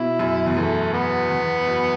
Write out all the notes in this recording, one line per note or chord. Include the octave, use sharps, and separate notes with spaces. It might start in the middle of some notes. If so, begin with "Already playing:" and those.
Already playing: B2 E4
F#2
E2
F#2 E3 A3
B3
E2
F#2